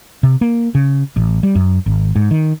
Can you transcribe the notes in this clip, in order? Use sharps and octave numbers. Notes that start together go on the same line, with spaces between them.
C3
A#3
C#3
A1
G3
F#2
G#1
G#2
D#3